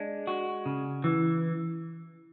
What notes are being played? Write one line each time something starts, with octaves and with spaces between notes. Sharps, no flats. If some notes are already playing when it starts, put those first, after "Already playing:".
Already playing: G#3 D4
F#4
C#3
E3